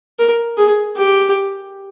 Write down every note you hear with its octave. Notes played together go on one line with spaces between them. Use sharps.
A#4
G#4
G4